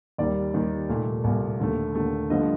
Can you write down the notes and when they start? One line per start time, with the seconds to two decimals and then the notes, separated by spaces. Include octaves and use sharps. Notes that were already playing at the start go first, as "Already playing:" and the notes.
0.18 D#2 D#3 G3 D5
0.54 D#2 D#3 G3
0.89 C2 A#2 A3
1.24 C2 A#2 A3
1.60 D#2 D3 A3
1.95 D#2 D3 A3
2.30 G2 D3 F3 A3 D#5